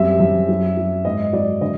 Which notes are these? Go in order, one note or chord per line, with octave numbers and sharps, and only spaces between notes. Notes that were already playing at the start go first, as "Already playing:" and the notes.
Already playing: F#2 G3 C4 E5
F#2
F#3
F#3
G#2 D#5
F#3 D5
D3 D#5